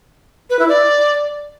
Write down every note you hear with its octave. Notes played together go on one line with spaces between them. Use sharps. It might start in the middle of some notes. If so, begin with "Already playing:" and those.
B4
E4
D5